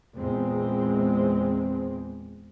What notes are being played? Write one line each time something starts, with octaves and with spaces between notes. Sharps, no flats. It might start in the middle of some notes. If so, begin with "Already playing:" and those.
E2 A#2 G#3 C4